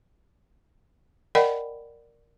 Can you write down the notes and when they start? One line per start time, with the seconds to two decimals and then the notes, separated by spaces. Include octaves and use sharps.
1.35 A#4 D5 D#5 F#5 G5 B5